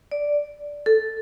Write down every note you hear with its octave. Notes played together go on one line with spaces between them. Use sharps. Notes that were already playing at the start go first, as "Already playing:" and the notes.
D5
A4